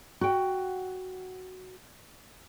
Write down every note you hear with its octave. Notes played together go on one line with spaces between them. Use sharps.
F#4 G5